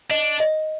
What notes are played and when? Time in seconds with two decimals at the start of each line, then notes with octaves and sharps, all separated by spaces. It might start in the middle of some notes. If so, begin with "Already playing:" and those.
0.11 D4 D#5
0.40 D#5